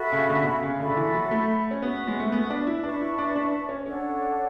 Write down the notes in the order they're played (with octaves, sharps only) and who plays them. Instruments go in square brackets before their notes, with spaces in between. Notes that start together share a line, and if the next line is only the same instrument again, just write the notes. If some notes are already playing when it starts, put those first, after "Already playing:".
Already playing: [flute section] F#4 A4 E5 B5
[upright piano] C#3
D3
B2
C#3
C#3
[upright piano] D3 [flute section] F#4 A4 E5 B5
[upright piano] D3
E3
F#3
A3
C#4
[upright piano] B3 [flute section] F#4 B4 E5
[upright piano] G#3
A3
B3
D4
E4
[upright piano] D4 [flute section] B4 E5 A5 C#6
[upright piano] E4
D4
D4
C#4
[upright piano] C#4 [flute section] D4 A4 C#5 F#5